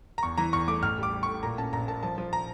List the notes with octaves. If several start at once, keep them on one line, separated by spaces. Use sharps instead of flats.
A#5
E2 C#6
E3 A#5
E2 C#6
A3 D6
A1 F6
G3 D6
G3
A2 C#6
A#2 A#5
C#4 A5
A#1 A#5
A#2 A5
F3 A5
F3
A#5